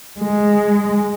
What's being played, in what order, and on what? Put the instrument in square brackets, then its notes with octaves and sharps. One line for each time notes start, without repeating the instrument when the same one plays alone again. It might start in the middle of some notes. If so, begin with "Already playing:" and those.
[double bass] G#3